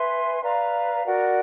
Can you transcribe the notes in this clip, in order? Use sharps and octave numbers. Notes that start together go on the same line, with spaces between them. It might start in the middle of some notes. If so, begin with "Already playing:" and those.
Already playing: B4 E5 G#5 C6
B4 D5 F5 A#5
F#4 A#4 D5 F#5